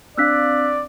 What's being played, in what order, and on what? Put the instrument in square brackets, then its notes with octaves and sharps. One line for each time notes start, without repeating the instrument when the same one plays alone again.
[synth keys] C4 D4 F5 [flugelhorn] D5 [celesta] E6 F#6 B6